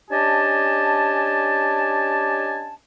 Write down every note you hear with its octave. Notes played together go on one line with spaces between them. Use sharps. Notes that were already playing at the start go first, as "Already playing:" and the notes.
C#4 D4 G4 D#5 G#5 A5